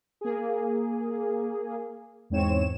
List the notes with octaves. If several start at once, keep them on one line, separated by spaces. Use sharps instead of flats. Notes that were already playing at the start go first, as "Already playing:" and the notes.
A#3 G#4
E2 G#2 C4 C#5 E7